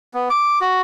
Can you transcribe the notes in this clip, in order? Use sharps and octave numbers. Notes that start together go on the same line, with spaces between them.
B3
D6
F#4